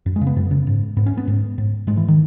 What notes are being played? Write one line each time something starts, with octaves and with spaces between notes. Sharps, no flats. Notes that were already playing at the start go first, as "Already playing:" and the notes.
F#2
G#3
C#3
B3
F#2
C#3
G#2
G#2 B3
C#4
B3
G#2
G#2
G#2 G#3
E3
D#3